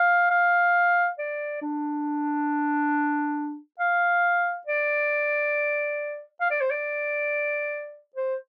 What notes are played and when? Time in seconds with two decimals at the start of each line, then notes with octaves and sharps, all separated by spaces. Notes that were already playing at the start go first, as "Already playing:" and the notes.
Already playing: F5
0.30 F5
1.18 D5
1.62 D4
3.80 F5
4.67 D5
6.41 F5
6.51 D5
6.61 C5
6.71 D5
8.16 C5